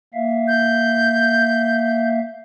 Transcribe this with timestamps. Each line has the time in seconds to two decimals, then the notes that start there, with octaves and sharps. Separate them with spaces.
0.14 A#3 E5 F5
0.48 G6